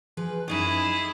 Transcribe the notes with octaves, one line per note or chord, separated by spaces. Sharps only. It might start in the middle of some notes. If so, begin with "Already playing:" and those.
F3 G#4 B4
F#2 D#4 E4 G#4 C#5